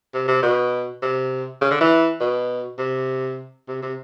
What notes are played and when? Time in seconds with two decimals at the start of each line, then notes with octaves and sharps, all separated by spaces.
0.14 C3
0.28 C3
0.43 B2
1.02 C3
1.61 C#3
1.71 D3
1.81 E3
2.20 B2
2.79 C3
3.68 C3
3.83 C3